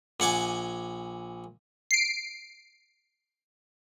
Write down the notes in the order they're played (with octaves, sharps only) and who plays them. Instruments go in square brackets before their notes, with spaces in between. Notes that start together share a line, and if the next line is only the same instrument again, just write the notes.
[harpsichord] A#1 F#5 G#5 D6
[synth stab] C7 D7